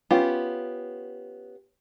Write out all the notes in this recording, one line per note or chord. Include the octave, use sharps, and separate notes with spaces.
B3 C#4 F4 G4